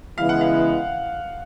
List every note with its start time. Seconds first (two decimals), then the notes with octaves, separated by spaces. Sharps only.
0.17 C#3 E3 G#3 B3 E4 F5
0.29 F#5
0.41 F5